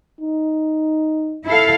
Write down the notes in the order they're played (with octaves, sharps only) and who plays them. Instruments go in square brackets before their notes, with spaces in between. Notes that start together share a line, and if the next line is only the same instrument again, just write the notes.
[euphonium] D#4
[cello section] E4 A4 F5